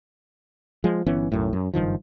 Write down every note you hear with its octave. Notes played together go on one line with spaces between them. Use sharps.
F3 G#3
G1 E3 B3 C#4
B1 F#2 A2
F#2
F#1 G2 D#3 F3